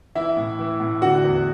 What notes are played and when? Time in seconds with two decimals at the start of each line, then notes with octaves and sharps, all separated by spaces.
0.15 E3 E4 E5
0.37 A2
0.59 E3
0.80 A2
1.02 D3 F#4 F#5
1.24 E2